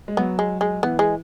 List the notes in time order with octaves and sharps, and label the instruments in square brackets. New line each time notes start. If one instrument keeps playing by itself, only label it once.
[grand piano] G#3
[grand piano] F#3 [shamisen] B3
[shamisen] G#3
G#3
[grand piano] E3 [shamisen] B3
[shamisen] G#3